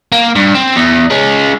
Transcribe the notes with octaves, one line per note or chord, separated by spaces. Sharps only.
A#3
G2
C4
E2
G#3 C#4